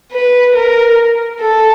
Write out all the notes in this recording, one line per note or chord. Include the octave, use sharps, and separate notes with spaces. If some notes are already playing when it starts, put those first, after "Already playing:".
B4
A#4
A4